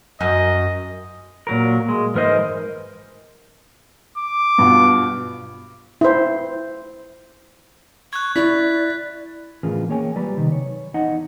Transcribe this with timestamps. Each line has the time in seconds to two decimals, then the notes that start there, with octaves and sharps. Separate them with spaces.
0.21 F#2 D#5
1.47 A#2 F#3 A#4
1.89 G#3
2.14 G#2 E3 A#4 C5 D#5
4.18 D6
4.58 G2 B2 F4
6.01 E4 C5
8.13 C#6 F#6 G#6
8.36 E4 D5 B6
9.63 A2 E3 C#4 F4 G#4 A#4
9.89 A#3 G#4 C#5 G5 G#5
10.16 F#3 G3 B4 D5 A#5
10.37 C3 D#3
10.52 C#5
10.94 E2 D#4 D#5 F#5